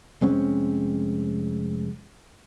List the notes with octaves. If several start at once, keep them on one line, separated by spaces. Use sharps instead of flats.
F1 G#3 C4 C#4